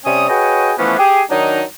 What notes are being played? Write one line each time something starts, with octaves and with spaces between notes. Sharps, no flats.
C3 G3 C#4 G#5 D#6
F#4 G#4 B4 C#5 D#5 G5
E3 F3 A3 B3 C#4 D4
G4 G#4
D#3 F#3 D4 D#4